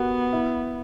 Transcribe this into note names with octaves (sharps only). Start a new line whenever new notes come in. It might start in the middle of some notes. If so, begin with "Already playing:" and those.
Already playing: B3 F#4 G4 A#4
E4